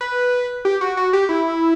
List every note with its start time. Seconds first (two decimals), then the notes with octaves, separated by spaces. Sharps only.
0.01 B4
0.65 G4
0.81 F#4
0.97 F#4
1.13 G4
1.29 E4